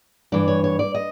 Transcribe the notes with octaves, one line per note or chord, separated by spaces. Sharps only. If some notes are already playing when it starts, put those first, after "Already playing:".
G2 E3 D5
C#5
C#5
D5
D#5